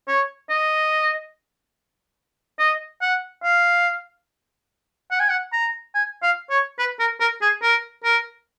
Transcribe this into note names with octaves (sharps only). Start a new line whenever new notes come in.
C#5
D#5
D#5
F#5
F5
F#5
G#5
F#5
A#5
G#5
F5
C#5
B4
A#4
A#4
G#4
A#4
A#4